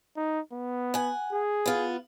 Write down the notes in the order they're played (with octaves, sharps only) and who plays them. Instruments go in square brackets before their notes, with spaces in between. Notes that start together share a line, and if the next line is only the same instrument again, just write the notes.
[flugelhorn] D#4
B3
[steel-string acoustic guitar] F#5 G#5
[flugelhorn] G#4
[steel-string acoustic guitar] B3 F4